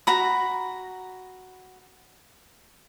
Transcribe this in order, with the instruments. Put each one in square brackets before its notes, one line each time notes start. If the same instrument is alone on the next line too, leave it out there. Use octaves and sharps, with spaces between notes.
[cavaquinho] F#4 A#5 B5